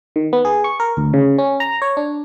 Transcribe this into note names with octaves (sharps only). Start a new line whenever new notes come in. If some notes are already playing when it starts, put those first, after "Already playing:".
D#3
B3
G#4
C#6
A#4
D2
C#3
C#4
A#5
C#5
D4